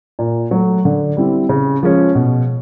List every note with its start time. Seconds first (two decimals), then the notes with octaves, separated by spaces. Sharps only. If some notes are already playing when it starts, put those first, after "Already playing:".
0.19 A#2
0.51 F#3 A3
0.85 D3
1.17 G3 C4 E4
1.49 C#3
1.83 F3 G#3 C#4
2.15 B2